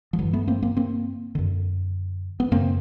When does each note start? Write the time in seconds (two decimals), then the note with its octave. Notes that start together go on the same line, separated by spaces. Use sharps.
0.13 F3
0.19 G2 D3 E3 F#3
0.33 A3 B3
0.47 A#3 C4
0.62 A#3 C4
0.77 A#3 C4
1.35 F#2 D3
2.40 B3
2.51 F#2 C#3 A#3 C4